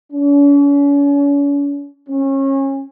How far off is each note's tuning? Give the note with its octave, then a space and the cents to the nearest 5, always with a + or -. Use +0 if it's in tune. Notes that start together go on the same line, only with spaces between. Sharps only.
C#4 +40
C#4 -30